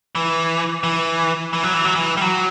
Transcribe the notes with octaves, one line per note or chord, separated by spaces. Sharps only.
E3
E3
E3
F#3
E3
F#3
E3
G3
F#3